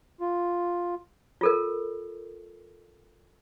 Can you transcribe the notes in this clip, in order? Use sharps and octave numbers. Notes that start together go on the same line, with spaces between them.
F4
F4 A4 A#4